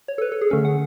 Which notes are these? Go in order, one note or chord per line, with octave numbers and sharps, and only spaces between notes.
C#5
A4
B4
A4
G#4
D3 A3 C#4 A4
F#5